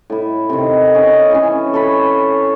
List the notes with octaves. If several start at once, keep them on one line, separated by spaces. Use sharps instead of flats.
A2 E4
C3 D#3
C#4 D#5 F#5
E3 A3 C#4
A4 B4 C#5 B5